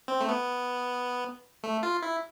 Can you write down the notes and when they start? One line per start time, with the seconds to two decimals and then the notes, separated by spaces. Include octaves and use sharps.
0.08 C4
0.21 A3
0.29 B3
1.63 A3
1.83 F4
2.02 E4